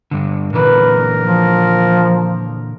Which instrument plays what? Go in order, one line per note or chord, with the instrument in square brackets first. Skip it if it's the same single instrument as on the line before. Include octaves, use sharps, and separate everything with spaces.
[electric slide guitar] G2 D3
[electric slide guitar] A#2 D3 E3 [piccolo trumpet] A#4 [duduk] B4
[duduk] F3